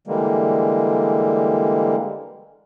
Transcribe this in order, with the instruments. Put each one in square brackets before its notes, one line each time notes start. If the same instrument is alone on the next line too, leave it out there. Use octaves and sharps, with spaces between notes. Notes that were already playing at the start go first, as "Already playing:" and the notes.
[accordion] D3 E3 G3 G#3 A#3